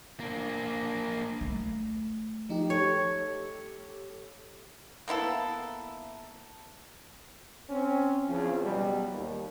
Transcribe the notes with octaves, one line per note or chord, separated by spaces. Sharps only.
A#3 D4
A3
F3 D#4 G4
G4 A4 C#5
A#3 B3 E4 A4
C4 C#4
E2 C#3 F3
B2 F#3 G3
D#2